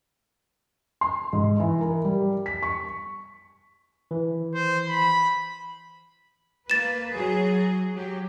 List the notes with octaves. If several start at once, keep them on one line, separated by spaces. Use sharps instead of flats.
C6
G#2
E3
A#4
G3
B6
C#6
E3
C5
B5
A#3 B4 A6 E7
F#3 G#4
F#3 G4